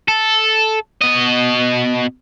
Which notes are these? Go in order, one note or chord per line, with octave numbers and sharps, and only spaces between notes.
A4
B2 D#5